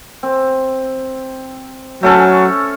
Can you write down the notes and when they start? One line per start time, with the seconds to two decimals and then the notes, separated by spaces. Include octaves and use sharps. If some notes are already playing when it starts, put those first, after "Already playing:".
0.23 C4
2.03 F#3 A3 C#4 A4